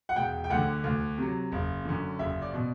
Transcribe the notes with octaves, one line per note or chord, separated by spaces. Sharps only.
F#5
E1 G5
G5
D2 D3 F#5
D2
C3 F#3
F#1
F#2 D3
F#1 E5
D5
B2